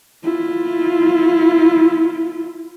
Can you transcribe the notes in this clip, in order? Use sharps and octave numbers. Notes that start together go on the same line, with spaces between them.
E4 F4